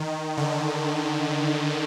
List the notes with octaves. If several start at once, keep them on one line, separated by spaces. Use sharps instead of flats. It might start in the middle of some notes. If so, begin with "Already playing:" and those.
Already playing: D#3
D3